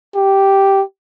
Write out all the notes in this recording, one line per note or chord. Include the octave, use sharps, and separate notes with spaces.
G4